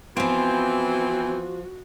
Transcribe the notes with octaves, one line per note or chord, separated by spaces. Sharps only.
E3 F3 B3 C4 F4 F#4 G#5